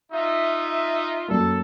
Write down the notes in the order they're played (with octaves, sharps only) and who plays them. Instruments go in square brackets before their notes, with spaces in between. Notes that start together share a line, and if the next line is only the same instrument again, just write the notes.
[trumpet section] D#4 F4 [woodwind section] E5
[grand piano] F#2 A#3 [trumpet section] A4